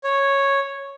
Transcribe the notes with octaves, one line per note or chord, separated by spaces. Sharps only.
C#5